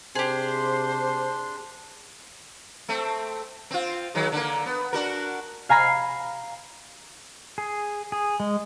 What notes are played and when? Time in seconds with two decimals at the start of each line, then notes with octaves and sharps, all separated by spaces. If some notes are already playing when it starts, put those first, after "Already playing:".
0.15 C3 D4 G4 G#4 C5 C6
2.89 A3 C4
3.71 C4 F4
4.15 D#3 F#3 G#3
4.32 D3 A#3
4.66 B3
4.93 D4 F#4 A#4
5.69 F5 G#5 A#5 B5 C7
7.58 G#4
8.12 G#4
8.40 G#3